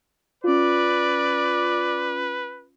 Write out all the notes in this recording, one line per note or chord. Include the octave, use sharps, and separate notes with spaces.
C#4 F4 B4 D5